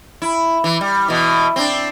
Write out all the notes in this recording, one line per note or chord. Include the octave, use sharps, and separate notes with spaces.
E4
E3
G3
B2 E3
C4 D4